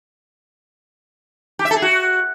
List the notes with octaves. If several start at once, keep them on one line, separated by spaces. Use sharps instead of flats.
G4
E5
A4
G#4
F#4